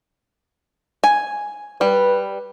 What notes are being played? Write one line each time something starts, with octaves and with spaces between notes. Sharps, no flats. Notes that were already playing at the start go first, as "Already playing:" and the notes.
G#5
G3 B4